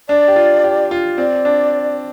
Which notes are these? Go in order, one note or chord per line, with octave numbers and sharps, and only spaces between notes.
D4 D5
G4
F4
G4
F4
C4 D5
D4